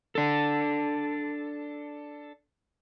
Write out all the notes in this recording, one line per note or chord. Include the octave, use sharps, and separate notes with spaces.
D4 A4